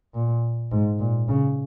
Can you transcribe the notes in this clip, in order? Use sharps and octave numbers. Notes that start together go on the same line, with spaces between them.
A#2
G#2
A#2
C#3